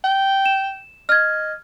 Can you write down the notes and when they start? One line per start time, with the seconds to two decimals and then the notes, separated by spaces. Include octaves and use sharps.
0.04 G5
0.46 E7
1.09 D#5 F6 G#6